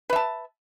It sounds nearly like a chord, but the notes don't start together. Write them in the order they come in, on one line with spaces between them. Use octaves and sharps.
B4 E5 A5